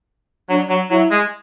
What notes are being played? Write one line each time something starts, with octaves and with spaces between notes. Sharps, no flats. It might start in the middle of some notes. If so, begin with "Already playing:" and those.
F#3 D4
F#3
F#3 E4
G#3